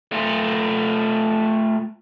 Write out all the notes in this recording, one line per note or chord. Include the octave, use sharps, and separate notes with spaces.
A3 F4